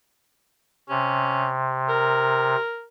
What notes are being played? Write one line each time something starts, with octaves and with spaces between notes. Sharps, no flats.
C3 C#4
A#4